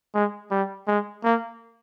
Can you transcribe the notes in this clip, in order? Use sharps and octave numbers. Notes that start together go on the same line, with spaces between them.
G#3
G3
G#3
A#3